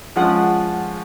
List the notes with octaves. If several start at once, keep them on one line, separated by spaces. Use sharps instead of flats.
F3 G#3 C#4 F4 F#5